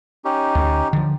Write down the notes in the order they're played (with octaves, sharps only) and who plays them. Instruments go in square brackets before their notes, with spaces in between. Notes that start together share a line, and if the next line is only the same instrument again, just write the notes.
[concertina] C#4 D#4 G4
[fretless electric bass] D2
D3 F3